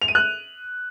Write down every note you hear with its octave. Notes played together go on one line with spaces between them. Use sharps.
F7
D#7
F#6